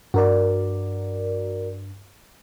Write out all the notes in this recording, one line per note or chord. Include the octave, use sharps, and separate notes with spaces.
G2 F#4 A#4 D5